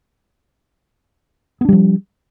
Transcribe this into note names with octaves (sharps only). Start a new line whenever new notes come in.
F3 G3 B3 D4